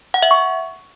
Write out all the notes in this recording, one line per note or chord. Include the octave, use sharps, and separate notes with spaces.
F#5
E5
C#6